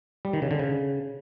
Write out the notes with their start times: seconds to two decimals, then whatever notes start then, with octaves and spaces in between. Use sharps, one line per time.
0.25 G3
0.33 D#3
0.42 C#3
0.51 D3
0.59 C#3